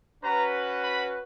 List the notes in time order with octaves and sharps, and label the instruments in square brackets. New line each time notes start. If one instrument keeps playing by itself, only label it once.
[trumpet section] C#4 F#4 B4 [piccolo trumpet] A#5
[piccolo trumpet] B5